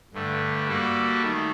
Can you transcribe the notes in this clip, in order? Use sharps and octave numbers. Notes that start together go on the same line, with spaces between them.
G2 D3 A3
G3 A#3 F#4 A4
D#3 A3